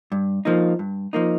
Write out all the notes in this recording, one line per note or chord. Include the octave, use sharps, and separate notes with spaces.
G2
F3 A#3 D#4
G2
F3 A#3 D#4